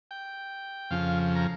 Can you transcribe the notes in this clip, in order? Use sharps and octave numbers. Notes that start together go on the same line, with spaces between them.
G5
F2 C#3 F3 F5
A#5